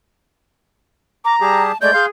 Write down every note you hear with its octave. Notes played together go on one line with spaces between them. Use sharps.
A#5 D6
G3 G4 G#4 A5
G#3 A3 D5 G6
G#4 F5 C6